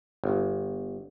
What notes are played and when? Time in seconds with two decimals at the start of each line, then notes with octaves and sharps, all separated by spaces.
0.24 G1